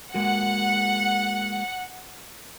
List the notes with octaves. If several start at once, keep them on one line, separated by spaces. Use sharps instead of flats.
G#3 A#3 F#4 F#5